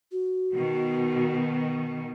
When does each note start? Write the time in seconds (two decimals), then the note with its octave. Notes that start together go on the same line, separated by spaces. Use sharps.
0.12 F#4
0.53 B2 D#3